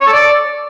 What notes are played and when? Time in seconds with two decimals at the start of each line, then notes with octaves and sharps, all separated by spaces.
0.01 C#5
0.07 A4
0.13 D5